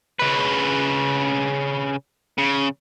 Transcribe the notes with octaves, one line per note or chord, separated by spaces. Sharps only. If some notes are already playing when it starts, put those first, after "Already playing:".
C#3 B4
C#3